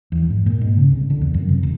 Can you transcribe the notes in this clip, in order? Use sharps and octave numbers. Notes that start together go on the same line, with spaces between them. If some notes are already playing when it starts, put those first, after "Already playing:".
E2
G#2
A#2
G#2
C#3
C2
D3
E2
F#2
C3
E1